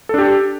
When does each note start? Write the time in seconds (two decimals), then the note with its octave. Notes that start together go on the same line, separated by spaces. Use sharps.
0.09 A4
0.14 D4
0.18 G4